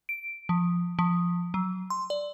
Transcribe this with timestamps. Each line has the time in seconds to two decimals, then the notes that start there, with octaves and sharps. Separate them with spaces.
0.09 D7
0.49 F3
0.99 F3
1.54 F#3
1.90 C6
2.10 D5